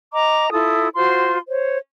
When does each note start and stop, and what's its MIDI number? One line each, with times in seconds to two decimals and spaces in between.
0.13 0.48 75
0.13 0.48 82
0.13 0.48 86
0.51 0.88 64
0.51 0.88 65
0.51 0.88 69
0.51 0.88 87
0.95 1.37 65
0.95 1.37 66
0.95 1.37 72
0.95 1.37 84
1.48 1.78 72
1.48 1.78 73